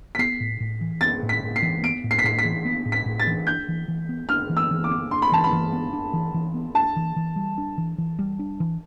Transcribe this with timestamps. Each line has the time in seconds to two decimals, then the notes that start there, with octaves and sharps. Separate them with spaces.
0.15 B6
0.19 B3 C7
0.40 A2
0.60 A2
0.81 E3
1.01 B3 A6
1.22 A2
1.29 B6
1.43 A2
1.56 C7
1.62 E3
1.83 B3 D7
2.04 A2
2.11 C7
2.19 B6
2.24 A2 C7
2.39 B6
2.45 E3
2.65 B3
2.85 A2
2.92 B6
3.06 A2
3.20 A6
3.27 E3
3.47 D4 G6
3.68 E3
3.88 E3
4.09 B3
4.29 D4 F6
4.49 E3
4.57 E6
4.71 E3
4.84 D6
4.91 B3
5.11 D4 C6
5.22 B5
5.32 E3 A5
5.44 B5
5.52 E3
5.72 B3
5.93 D4
6.13 E3
6.34 E3
6.54 B3
6.75 D4 A5
6.96 E3
7.16 E3
7.36 G3
7.58 D4
7.78 E3
7.98 E3
8.19 G3
8.39 D4
8.60 E3